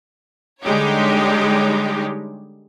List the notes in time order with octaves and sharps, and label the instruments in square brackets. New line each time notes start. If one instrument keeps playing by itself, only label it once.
[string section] D3 G3 G#3 D#4 G4 C#5